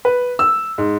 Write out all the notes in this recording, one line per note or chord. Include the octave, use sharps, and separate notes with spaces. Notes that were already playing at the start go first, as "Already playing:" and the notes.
B4
E6
G#2